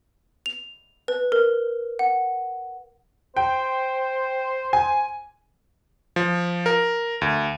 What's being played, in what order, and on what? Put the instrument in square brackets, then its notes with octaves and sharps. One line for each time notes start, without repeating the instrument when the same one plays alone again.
[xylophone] F7
B4
A#4
F#5
[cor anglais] C5 [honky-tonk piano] G5
[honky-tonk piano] G#5
[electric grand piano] F3
A#4
D2